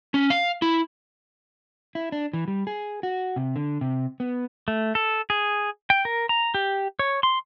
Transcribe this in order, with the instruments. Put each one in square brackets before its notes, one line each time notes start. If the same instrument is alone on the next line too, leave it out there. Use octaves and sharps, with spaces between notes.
[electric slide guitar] C#4
F5
E4
E4
D4
E3
G3
G#4
F#4
C3
D3
C3
B3
[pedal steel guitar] A3
A4
G#4
G5
A#4
A#5
G4
C#5
C6